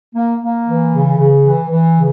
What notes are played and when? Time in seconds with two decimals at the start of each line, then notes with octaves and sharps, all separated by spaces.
0.15 A#3
0.40 A#3
0.67 E3
0.92 C#3
1.18 C#3
1.44 E3
1.69 E3
1.96 C#3